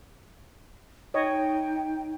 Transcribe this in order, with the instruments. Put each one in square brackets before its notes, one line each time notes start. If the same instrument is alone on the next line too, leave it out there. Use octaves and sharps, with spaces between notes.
[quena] D#4 [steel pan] C#5 D#5 [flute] G5